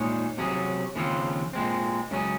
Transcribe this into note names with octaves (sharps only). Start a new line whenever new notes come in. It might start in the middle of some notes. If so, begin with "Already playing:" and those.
Already playing: A#2 G#3 D#4 G#4 C#5
C3 F#3 C#4 G#4
D#2 C#3 F3 C4 F4
A#2 G#3 C4
C#2 C#3 F#3 C#4 G#4